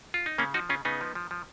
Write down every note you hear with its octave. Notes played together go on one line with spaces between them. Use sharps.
F4
D#4
C#3 A#3 C#4
F3 D#4 F#4
C#3 C#4 F4
C#3 B3 D#4
F3
F3
F3